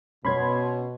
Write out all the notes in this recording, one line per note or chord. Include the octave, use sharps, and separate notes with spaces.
B2 C#4 C#5 B5 C6 G#6